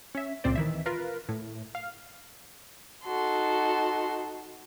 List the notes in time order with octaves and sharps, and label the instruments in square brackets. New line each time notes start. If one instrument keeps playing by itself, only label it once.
[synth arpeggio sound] C#4 E5
C#2 A#2 C4 C5 D5
D#3 E3 E5
F4 A#4 B4
A2
F5
[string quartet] D#4 F#4 A4 C6